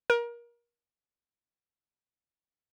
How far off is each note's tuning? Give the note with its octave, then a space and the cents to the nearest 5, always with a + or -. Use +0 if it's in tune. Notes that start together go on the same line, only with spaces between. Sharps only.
A#4 +25